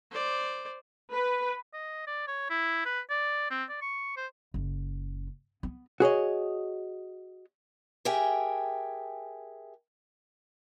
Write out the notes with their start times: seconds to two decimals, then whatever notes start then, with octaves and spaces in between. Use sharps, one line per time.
0.12 C5 D5
1.13 B4
1.73 D#5
2.07 D5
2.27 C#5
2.50 E4
2.85 B4
3.10 D5
3.51 C4
3.69 D5
3.82 C#6
4.17 C5
4.54 F#1
5.63 B3
6.00 F#4 G#4 C#5 D#5
8.05 G4 G#4 A#4 E5 G5 G#5